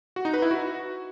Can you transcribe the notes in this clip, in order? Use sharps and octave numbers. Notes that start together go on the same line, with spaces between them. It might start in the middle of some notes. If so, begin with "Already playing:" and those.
F#4
D#4
B4
E4
F#4